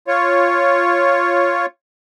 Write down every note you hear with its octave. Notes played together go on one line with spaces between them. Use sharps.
F4 C#5